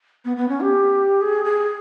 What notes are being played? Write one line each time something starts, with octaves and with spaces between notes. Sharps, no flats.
B3
B3
C#4
G4
G#4
G#4